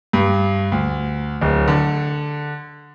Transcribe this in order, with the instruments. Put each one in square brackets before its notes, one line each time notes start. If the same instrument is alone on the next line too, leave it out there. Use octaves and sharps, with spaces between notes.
[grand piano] G2
D2
D1
D3